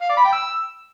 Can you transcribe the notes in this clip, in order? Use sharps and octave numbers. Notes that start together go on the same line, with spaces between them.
F5
D5
B5
G5
E6